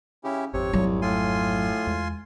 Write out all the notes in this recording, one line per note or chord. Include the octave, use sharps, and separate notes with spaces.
C#3 C#4 E4 G4
G#1 F2 G#2 C3 C#5
C2 F#3
A2 F4 G#5 C6
E2 G#3